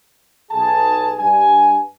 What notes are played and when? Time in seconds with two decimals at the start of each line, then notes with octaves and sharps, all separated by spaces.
0.51 B1 G#4 A5
1.20 G2 G3 G#5